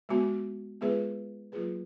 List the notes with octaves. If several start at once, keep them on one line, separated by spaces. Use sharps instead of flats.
G#3 B3 F#4
G#3 B3 F4 G#4 B4
F#3 A#3 F4 G#4 B4